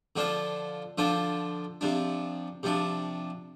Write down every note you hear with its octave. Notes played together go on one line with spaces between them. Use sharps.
D3 F3 D4 F4 C5
D3 F3 D4 F4 C5
C3 F3 D4
C3 F3 D4